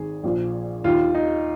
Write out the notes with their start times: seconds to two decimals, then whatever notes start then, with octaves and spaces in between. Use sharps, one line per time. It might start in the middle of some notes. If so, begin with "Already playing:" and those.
Already playing: G#1 D#3 G#4
0.24 A#1 A#2 F3
0.84 D#2 D#3 F4
1.15 D#4